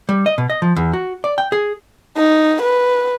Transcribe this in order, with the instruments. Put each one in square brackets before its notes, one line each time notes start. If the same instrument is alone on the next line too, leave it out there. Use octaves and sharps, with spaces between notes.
[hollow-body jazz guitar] G3
D#5
B2
D#5
F3
E2
F#4
D5
G5
G#4
[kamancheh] D#4
B4